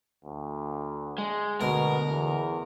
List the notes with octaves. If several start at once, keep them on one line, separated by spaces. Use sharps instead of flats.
D2
G#3
D2 B2 A#4 A#5
E2